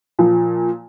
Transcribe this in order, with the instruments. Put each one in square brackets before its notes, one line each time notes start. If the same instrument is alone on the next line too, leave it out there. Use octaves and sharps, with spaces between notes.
[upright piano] A#2 F3